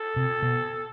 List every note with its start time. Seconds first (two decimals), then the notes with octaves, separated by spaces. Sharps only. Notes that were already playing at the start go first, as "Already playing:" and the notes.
Already playing: A4
0.16 C3
0.42 B2